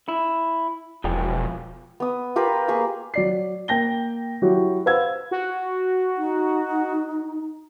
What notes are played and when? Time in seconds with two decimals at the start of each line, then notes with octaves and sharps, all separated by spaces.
0.09 E4
1.04 E1 F3 G5 G#5
2.00 B3 D#6
2.36 F4 G4 A#4 B4
2.68 A#3 G#4 B5 C#6
3.14 F#3 D5 C7
3.68 A#3 G5 A#6 G7
4.42 F#3 E4 F#4 G4
4.86 B4 C5 F5 F#5 E6 G#6
5.31 F#4
6.18 D#4